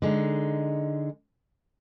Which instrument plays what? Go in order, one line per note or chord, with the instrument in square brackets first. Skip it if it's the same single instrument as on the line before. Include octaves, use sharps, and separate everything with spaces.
[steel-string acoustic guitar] D3 G#3 D#4